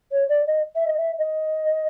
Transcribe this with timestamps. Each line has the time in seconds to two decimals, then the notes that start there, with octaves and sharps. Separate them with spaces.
0.11 C#5
0.29 D5
0.47 D#5
0.75 E5
0.87 D#5
0.97 E5
1.18 D#5